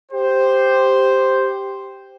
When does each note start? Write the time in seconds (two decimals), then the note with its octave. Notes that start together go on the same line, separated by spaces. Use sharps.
0.12 G4 C5